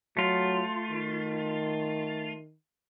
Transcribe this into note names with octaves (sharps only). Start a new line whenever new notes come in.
F#3 A3 F4
D#3